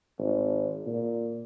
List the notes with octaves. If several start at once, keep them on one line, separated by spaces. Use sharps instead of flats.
G#1
A#2